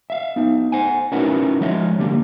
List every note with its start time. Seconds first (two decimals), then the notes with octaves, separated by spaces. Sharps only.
0.10 E5 F5
0.36 B3 D#4
0.72 C5 F#5 G#5
1.12 C#4 D#4 E4 F#4 A#4 B4
1.61 F3 G#3 C#5 E5
1.98 D3 G3 A#3